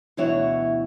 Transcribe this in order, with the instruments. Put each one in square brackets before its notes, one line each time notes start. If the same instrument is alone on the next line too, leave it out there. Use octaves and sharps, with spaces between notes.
[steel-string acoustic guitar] D2 B2 E3 E4 C#5 F#5